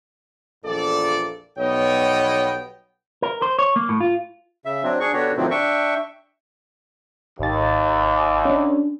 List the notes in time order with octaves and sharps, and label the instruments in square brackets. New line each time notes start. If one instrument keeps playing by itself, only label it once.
[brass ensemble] A#1 E2 A#2 A4 D5
B1 G3 B3 C#5 D#5 G5
[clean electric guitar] A#4
C5
C#5
A#3
A2
F4
[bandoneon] C#3 E5
F#3 C4 D4
D4 G#4 C#6
D3 B3 D4 F#4 G4 C#5
A2 C3 D#3 F3 F#3 C4
D4 E5 G5 C#6
[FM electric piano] G#1 A6 [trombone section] D#2
[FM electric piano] C#4 D4